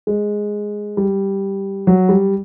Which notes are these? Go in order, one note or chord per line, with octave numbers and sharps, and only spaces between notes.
G#3
G3
F#3
G3